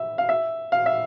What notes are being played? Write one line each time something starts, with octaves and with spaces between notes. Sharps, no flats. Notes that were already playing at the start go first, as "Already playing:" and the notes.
Already playing: E5
F5
E5
F5
E5